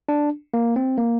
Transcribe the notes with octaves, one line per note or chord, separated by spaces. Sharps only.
D4
A#3
C4
A#3